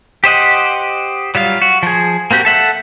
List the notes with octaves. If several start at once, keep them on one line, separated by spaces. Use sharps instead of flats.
G4 C5 D#5 F#5
F#3 G3 F4 F5
F#4
F3 G#4
A#3 C4 F#4 G4
A4 E5 F#5